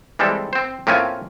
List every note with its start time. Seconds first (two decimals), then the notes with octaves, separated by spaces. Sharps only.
0.19 E3 G3 G#3 C4 A4
0.53 C4 C5
0.87 A2 A#3 C4 C#4 F4 G#5